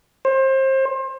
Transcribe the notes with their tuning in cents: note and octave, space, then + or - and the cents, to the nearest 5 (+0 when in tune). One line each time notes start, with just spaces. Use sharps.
C5 +30